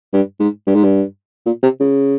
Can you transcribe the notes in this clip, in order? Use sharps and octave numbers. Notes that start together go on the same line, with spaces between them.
G2
G#2
G2
G#2
G2
A#2
C3
C#3